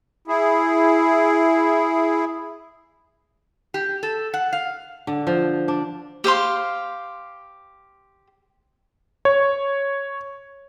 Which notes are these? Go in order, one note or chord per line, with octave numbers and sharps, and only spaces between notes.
E4 G#4
G4
A4
F#5
F5
D3
F3
D4
G4 C5 F5 C6
C#5